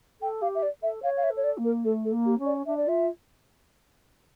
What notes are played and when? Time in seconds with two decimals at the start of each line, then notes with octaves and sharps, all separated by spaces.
0.21 A4 G5
0.42 G4 F5
0.55 E5
0.63 D5
0.83 A4 E5
1.03 C#5 F5
1.17 F5
1.23 E5
1.30 A4
1.37 C#5
1.44 D5
1.58 A#3
1.64 A#4
1.85 A3 A4
2.05 A4
2.11 A#3
2.26 G4
2.39 C#4
2.46 D5
2.66 D4 E5
2.77 D5
2.87 F4 E5